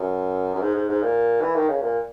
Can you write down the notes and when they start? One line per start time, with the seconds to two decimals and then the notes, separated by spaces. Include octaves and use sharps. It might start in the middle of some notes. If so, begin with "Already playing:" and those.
Already playing: F#2
0.55 F#2
0.62 G#2
0.75 G#2
0.89 G#2
1.02 A#2
1.41 E3
1.55 D#3
1.68 C#3
1.81 A#2